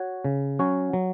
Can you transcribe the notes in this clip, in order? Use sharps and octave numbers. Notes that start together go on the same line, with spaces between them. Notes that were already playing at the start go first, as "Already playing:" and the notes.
Already playing: F#4 C#5
C#3
F#3 C#4 F#4 C#5
F#3